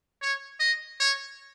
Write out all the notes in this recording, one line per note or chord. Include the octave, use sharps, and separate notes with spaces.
C#5
D#5
C#5